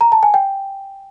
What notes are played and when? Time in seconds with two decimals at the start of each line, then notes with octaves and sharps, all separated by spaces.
0.01 A#5
0.12 A5
0.23 G#5
0.34 G5